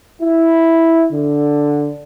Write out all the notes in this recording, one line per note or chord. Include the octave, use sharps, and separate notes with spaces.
E4
D3